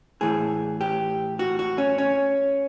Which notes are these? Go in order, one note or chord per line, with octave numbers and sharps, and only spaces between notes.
A2 E3 G#4
G4
F#4
F#4
C#4
C#4